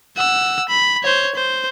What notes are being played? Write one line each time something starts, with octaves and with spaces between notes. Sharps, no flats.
F#5 E6
B5
C5 C#5
C5